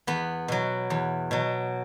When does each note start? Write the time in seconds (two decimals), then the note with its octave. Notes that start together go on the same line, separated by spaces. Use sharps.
0.07 E2 B3
0.48 B2 F#3
0.90 E2
1.31 B2 F#3